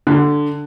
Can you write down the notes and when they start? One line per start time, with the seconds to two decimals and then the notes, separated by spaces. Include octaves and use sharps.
0.07 D3